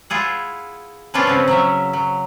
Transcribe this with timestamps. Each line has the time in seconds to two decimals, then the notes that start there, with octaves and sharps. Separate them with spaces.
0.10 E4 F4 G#4 F#5
1.14 F3 B3 C#4 D4 F4
1.27 C#3 C4 G#4
1.48 F#3 C#4 E5
1.93 F#3